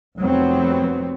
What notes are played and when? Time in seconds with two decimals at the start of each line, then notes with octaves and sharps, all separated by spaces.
0.19 F1 F#3 B3 C4